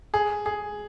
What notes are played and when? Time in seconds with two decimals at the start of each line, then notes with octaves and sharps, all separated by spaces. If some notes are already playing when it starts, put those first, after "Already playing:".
0.14 G#4
0.46 G#4